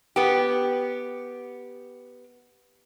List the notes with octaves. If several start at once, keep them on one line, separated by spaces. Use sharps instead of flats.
B3 G4